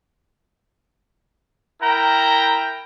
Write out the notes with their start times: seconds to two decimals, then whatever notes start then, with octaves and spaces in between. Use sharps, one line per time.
1.81 E4 A#4 G5 A#5